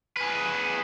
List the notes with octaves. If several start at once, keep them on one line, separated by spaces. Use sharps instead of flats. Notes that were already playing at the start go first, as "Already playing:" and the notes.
G#4 B4